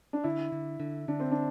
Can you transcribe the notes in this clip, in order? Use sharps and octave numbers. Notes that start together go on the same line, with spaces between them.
D4
D3 E4
D3
D3
D3 D4
C4
D4